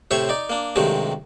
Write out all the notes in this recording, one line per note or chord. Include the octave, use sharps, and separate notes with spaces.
A2 C3 C5 C#5 E5 C#6
D#4 D5
A#3 D4
G2 C3 D#3 F#3 G#3 A3